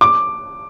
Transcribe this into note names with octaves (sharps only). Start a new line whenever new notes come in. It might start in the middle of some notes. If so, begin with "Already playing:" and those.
D6